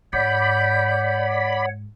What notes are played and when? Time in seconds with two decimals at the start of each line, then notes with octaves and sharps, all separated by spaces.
0.13 G#2 C#5 D5 F#5 B5 G6